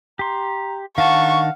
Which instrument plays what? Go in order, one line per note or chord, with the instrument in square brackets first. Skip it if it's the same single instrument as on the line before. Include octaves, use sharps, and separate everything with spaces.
[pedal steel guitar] G4 C6 [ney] A#5
[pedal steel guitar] D#3 D4 A5 [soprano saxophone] F5 [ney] F#5 [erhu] C#6